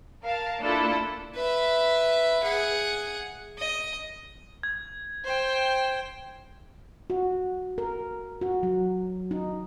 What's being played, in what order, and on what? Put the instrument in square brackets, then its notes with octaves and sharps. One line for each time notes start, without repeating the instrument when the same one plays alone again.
[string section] A#4 F5 A5
A#3 D4 E4 F4 A4
[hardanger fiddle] B4 E5
G#4 F#5
D#5
[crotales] G#6
[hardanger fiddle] C5 G5
[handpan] F#4
A#4
F#4
F#3
D#4